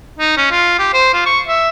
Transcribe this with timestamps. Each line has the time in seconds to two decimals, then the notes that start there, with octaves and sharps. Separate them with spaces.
0.19 D#4
0.37 C#4
0.51 F4
0.79 G4
0.93 C5
1.13 F4
1.26 C#6
1.47 E5